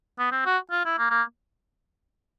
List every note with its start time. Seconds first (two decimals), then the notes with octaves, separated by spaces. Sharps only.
0.19 B3
0.32 C4
0.46 F#4
0.71 F4
0.85 E4
0.98 A#3
1.10 A#3